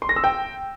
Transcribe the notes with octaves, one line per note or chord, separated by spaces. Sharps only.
C6
A#6
E6
G5